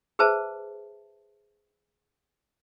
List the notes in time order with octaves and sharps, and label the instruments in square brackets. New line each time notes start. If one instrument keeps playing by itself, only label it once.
[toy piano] G#4 B4 C5 E5 A5